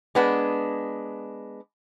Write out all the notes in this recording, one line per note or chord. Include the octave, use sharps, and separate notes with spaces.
G#3 B3 D4